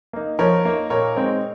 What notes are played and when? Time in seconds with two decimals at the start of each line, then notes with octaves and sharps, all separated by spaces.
0.13 A#3 D#4
0.39 F3 A#4 C#5
0.65 A#3 D#4
0.90 A#2 A#4 C#5
1.16 G#3 C4 D#4